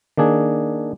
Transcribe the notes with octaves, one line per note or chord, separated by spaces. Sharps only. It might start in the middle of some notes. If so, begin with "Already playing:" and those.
D#3 A#3 D4 G#4